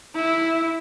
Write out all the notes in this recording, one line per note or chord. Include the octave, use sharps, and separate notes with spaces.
E4